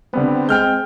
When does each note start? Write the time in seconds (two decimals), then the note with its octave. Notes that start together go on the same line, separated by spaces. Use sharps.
0.13 D3 G3 B3 C4
0.49 G#3 G5 F6 G6